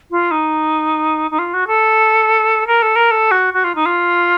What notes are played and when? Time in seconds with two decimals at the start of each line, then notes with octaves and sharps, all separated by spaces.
0.11 F4
0.31 D#4
1.31 D#4
1.39 F4
1.54 F#4
1.67 A4
2.67 A#4
2.82 A4
2.96 A#4
3.11 A4
3.31 F#4
3.54 F#4
3.64 F4
3.75 D#4
3.86 F4